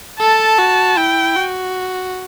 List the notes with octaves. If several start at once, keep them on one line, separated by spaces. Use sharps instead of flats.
A4 A5
F#4
E4 G5
F#4